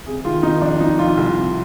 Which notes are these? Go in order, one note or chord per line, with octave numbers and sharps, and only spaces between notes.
C3 G#4
D#3 F4
D#3 D#4
F2 D4
F2 D#4
F2 F4
C2
C3